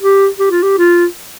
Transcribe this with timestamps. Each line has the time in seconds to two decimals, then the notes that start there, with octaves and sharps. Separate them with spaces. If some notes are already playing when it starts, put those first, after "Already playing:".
0.01 G4
0.39 G4
0.51 F4
0.63 G4
0.78 F4